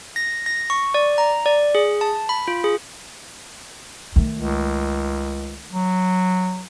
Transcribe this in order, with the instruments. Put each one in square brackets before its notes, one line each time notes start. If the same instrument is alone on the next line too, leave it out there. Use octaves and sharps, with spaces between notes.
[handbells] A#6
A#6
C#6
D5
A#5
D5
G#4
A5
B5
F4
G#4
[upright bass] D#3 A3
[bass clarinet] C#2
F#3